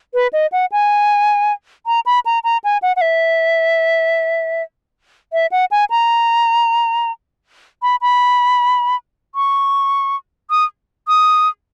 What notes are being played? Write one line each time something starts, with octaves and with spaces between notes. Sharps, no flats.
B4
D#5
F#5
G#5
A#5
B5
A#5
A#5
G#5
F#5
F#5
E5
E5
F#5
G#5
A#5
B5
B5
C#6
D#6
D#6